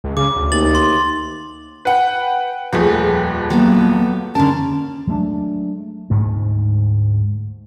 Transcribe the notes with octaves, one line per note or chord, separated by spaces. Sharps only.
C#2
C#3 D6
D2
D#2 A6 F#7
C6
B4 F#5 G5
D#1 F2 F3 A3 G#4 B4
F#3 A#3 B3 A4
D3 C#4 A#4 A5
F#3 G#3 A3 D4
D2 G#2 G#3 A3